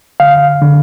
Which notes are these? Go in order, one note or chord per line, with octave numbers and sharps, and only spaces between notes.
D3 F5
D3